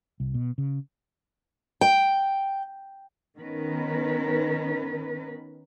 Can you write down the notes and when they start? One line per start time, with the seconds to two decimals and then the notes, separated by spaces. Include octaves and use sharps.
0.20 C2
0.34 B2
0.58 C#3
1.81 G5
3.38 D#3 B3 C#4 A#4 B4